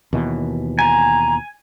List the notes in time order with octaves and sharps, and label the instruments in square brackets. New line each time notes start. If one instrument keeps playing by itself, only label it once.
[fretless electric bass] D#2 B2 E3
[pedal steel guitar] G#5 [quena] A#5